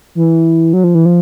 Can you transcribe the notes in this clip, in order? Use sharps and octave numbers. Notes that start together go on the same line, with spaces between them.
E3
F#3
F3
E3
F3